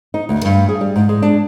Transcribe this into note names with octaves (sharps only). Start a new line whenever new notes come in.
D#4
D2
G2
G#4
G3
G#2
G#3
D4